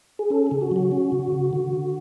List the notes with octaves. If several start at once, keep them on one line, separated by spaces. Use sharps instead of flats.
G#4
C#4 A4
C#3 G#4
F#4
F#3 F#4
C#4
C#3
C#3
D3
D3